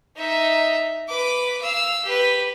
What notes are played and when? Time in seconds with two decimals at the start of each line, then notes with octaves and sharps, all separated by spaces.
0.16 D#4 E5
1.09 B4 D6
1.62 F5 E6
2.05 G4 B4